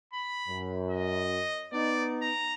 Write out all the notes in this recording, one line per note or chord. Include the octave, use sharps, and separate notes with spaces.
B5
F#2
D#5
B3 D#4 D5
A#5